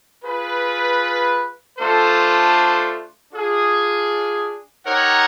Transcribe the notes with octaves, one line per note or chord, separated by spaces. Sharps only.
F4 G#4 B4
A3 D4 F4 A4 C5
D4 F4 G#4
D#4 G4 A#4 C#5 F#5